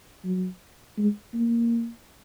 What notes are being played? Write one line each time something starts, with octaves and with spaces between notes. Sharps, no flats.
F#3
G#3
A#3